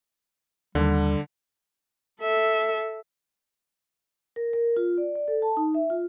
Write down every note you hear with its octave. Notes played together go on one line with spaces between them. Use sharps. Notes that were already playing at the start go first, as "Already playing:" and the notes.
D#2 D3 G3
A4 E5
A#4
A#4
F4
D5
D5
A4
A5
D#4
E5
F4